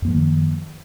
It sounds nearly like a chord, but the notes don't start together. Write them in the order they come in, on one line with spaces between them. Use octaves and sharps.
F#2 A#3 F3 D#3